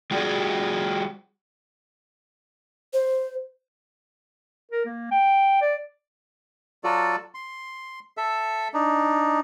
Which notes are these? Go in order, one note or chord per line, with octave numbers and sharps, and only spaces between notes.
G3 F4 F#4 G#4 D5
C5
A#4
A#3
G5
D5
F#3 F4 F#4 A4 D5
C6
A4 E5
D4 D#4